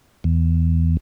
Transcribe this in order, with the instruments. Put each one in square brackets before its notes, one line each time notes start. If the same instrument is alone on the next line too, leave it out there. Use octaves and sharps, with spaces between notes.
[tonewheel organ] E2